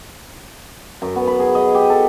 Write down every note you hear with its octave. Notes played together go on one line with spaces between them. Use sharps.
F#2
B3
B5
G#4
D#5
G4
A4